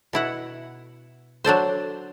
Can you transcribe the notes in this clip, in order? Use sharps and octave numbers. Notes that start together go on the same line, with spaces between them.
B2 E4 F#5
F#3 D4 A4 C5